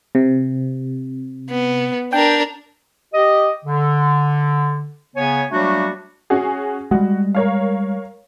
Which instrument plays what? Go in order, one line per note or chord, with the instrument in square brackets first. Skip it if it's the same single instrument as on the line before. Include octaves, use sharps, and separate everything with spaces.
[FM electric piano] C3
[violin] B3
[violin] D4 A#4 [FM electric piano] G5
[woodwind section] G4 D#5
D3
C#3 B3 C#5 G#5
F#3 G3 A3 A#3 D4 F#4
[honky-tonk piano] C#4 F#4 G#4
[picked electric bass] G3 G#3 [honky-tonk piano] F#4
[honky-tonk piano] A#4 C#5 F5